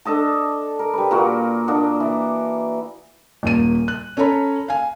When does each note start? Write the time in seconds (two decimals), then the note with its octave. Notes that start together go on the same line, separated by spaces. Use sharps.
0.05 D4 A4 D#5 A5
0.79 A#4
0.93 G3 B4
1.11 A#2 A#3 F#4
1.68 A#3 D4 D#5 F#5
2.00 E3
3.43 D#1 A#3 D#7
3.88 F#6
4.17 C#4 A4 C#5 A#5 B5
4.68 F5 G#5